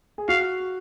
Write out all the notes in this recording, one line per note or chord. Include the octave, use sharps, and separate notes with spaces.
G#4
F#4 F5